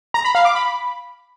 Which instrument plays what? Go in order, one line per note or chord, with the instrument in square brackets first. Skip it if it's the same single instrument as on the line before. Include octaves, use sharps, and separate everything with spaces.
[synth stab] A#5
B5
F5
D6
B5